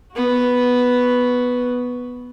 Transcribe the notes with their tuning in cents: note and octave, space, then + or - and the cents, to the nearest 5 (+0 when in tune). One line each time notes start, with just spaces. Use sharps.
B3 +0 F#4 +0